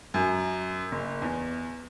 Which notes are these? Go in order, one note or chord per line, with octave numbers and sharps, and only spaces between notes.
F#2
F#1
E2